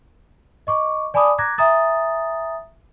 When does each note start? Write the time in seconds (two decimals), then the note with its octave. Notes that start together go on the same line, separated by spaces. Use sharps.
0.67 D#5 C#6 D6
1.14 D5 G#5 A5 B5 D6 D#6
1.38 A#5 D6 F#6 G#6 A#6
1.58 E5 G#5 A#5 D#6 A6